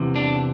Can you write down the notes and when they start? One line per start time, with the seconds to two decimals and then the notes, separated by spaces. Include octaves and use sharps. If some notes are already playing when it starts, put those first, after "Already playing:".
Already playing: E2 C3 E3
0.16 D4